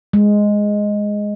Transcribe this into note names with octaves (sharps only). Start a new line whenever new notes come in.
G#3